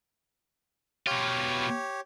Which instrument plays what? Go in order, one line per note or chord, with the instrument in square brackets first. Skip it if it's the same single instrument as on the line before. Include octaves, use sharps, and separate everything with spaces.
[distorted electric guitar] B2 F4 [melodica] G4 C#5